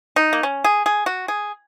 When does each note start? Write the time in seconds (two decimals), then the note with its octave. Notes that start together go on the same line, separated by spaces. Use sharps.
0.16 D#4
0.33 A#3
0.43 C#4
0.64 G#4
0.86 G#4
1.06 F#4
1.28 G#4